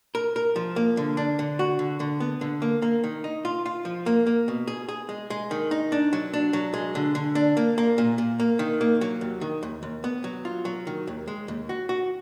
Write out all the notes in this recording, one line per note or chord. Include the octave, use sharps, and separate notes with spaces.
A#4
A#4
F3
A#3
D3
D4
D3
F#4
D3
D3
B3
D3
A#3
A#3
D#3
D#4
F4
F4
F3
A#3
A#3
B2
G#4
G#4
G#3
G#3
D#3
D#4
D4
F#3
D4
F#3
G#3
D3
D3
D4
A#3
A#3
A#2
A#2
A#3
D#3
A#3
F#3
D#2
D#3
D#2
D#2
B3
F#3
F4
F#3
D#3
D#2
G#3
D#2
F#4
F#4